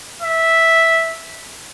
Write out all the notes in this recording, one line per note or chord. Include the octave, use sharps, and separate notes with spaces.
E5